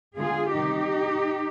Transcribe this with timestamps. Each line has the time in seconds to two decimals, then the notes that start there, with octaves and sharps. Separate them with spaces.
0.16 D3 G#3 B3 F4 G#4
0.53 C3 D#3 G3 D#4 G4